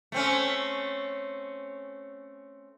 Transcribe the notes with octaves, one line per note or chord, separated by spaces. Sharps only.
A3 C4 C#4